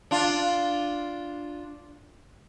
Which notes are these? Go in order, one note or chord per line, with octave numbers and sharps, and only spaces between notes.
D4 F4